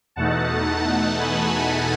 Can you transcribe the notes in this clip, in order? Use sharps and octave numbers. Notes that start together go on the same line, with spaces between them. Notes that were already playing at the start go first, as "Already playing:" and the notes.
E2 B2 A3 D#4 F#5 A5
F#5 A5
G#5 B5